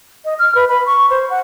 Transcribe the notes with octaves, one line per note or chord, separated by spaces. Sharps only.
D#5
F6
B4
B5
C#6
C5
F#5